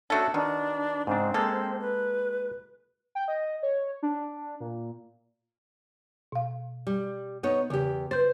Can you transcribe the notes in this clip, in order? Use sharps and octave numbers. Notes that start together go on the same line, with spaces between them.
A3 C#4 D4 F#4 A4
B2 D#3 D4
G#2 C#3 C4 D4
G#3 A#3 A4
B4
G5
D#5
C#5
D4
A#2
B2 F5
G3
B3 D#4 C#5
E2 C#3 G4
B4 C5 G6 A6